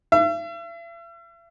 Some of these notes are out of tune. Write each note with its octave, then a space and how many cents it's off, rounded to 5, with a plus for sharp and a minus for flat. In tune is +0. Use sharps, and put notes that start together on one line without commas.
E5 +45